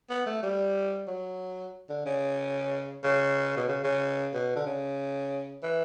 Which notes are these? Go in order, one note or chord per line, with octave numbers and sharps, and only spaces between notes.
B3
A3
G3
F#3
D3
C#3
C#3
B2
C#3
C#3
B2
D3
C#3
E3